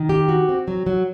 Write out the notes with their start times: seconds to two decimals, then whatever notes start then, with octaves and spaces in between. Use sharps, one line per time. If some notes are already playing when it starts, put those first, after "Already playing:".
Already playing: D#3
0.09 G4
0.29 F#4
0.49 C4
0.68 F#3
0.87 F#3